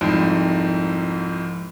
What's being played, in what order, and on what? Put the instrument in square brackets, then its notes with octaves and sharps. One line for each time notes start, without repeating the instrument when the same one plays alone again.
[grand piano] C2 F2 G#2